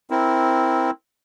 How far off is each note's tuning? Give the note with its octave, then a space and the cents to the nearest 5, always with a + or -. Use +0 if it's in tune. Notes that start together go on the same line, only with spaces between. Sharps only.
C4 +0 E4 -5 A#4 +0